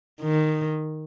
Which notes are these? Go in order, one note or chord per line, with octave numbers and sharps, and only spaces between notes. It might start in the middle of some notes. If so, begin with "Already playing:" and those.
D#3